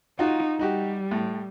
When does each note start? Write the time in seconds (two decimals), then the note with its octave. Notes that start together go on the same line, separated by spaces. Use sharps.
0.19 D#4 F4 F#4
0.59 G3 D#4 F#4 G4
1.11 A2